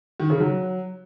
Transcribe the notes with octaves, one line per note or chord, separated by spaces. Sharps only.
D#3
C#3
F#3